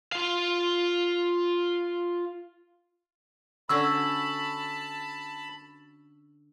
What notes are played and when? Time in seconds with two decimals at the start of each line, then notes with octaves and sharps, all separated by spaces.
0.12 F4 F5
3.69 D3 C#4 F#4 A5 B5 E6